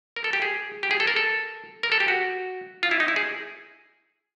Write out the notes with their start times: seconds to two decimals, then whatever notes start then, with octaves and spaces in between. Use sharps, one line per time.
0.16 A#4
0.24 A4
0.33 G4
0.42 G#4
0.83 G4
0.91 G#4
1.00 A4
1.07 A#4
1.16 A4
1.83 A#4
1.92 A4
2.00 G4
2.08 F#4
2.83 F4
2.91 E4
3.00 D#4
3.08 E4
3.16 G#4